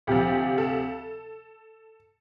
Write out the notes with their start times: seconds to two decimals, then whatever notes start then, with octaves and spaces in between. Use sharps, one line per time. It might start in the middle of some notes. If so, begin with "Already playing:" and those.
0.07 D2 C3 F3 G4
0.58 A4